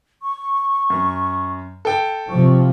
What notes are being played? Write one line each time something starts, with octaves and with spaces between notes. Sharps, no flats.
C#6
F#2
A4 G5
C3 F3 C#6